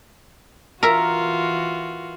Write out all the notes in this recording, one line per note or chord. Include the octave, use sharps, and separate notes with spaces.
E3 F4 F#4 A#4 E5